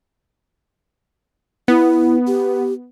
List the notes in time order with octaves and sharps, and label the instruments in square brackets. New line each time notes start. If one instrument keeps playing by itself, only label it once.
[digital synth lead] B3 [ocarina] E4
[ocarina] G4